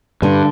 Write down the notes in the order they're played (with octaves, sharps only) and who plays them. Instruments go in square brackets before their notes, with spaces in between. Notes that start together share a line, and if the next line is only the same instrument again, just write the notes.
[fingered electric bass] G2 [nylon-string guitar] D3